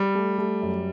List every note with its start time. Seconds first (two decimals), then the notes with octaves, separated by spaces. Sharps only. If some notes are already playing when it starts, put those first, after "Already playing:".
Already playing: G3
0.15 A3
0.38 A3
0.62 F#2